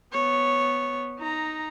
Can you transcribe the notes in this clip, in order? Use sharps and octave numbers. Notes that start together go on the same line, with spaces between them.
B3 C#5
D#4 A#5